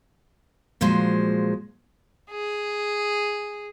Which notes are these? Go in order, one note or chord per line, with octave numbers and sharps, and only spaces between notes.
A#2 F3 F#3 G#3 C5
G#4